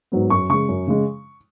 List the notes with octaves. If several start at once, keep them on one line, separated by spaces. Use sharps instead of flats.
G#2 F#3 B3
F#2 C#6
C#3 G#3 C#6
F#2
C#3 G#3